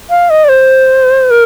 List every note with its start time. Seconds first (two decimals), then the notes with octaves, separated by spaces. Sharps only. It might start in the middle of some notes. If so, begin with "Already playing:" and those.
0.10 F5
0.30 D#5
0.44 D5
0.49 C5
1.30 A#4